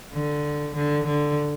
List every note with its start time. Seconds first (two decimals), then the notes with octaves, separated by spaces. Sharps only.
0.13 D3
0.75 D3
1.07 D3